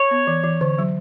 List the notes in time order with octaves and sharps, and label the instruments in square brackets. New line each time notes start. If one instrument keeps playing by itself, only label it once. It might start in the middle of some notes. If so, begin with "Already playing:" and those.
Already playing: [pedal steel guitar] C#5
[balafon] B3
E3
E3
D3
F#3